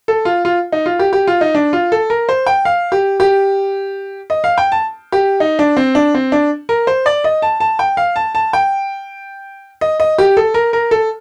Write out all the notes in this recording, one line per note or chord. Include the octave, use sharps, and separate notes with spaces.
A4
F4
F4
D#4
F4
G4
G4
F4
D#4
D4
F4
A4
A#4
C5
G5
F5
G4
G4
D#5
F5
G5
A5
G4
D#4
D4
C4
D4
C4
D4
A#4
C5
D5
D#5
A5
A5
G5
F5
A5
A5
G5
D#5
D#5
G4
A4
A#4
A#4
A4